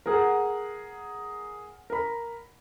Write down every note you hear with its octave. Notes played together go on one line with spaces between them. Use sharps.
G#4 A#4 F#5
A#4 B5